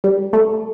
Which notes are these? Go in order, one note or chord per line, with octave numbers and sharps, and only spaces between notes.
G3
A3